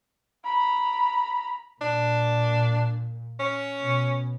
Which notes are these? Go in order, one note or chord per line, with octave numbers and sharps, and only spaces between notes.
A#5 B5
A#2 D4
C#4
B2